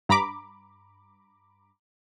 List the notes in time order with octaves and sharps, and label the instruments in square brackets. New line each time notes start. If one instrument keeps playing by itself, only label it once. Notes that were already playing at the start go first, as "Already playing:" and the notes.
[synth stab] G2 A#5 B5 D6